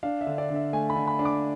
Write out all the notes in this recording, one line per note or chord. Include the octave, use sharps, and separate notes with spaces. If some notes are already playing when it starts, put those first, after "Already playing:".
D4 F5
E5
D3
D5
D3
E5
A3 G#5
B5
D3
B5
D4
D6